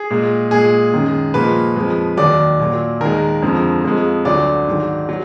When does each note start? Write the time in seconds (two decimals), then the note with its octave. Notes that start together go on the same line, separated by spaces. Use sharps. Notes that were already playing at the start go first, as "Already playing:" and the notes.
Already playing: G#4
0.10 A#2 G#3
0.51 A#2 G#3 G#4
0.93 F#2 D#3 G#3
1.34 A#2 F3 G#3 B4
1.76 F2 F3 G#3
2.17 D#2 D#3 F#3 D5
2.60 A#2 F#3
3.00 D#2 D#3 G#3 A#4
3.42 F2 D3 F3 G#3
3.84 F2 F3 G#3
4.25 D2 D3 F#3 D5
4.67 G#2 D#3 F#3
5.09 F#3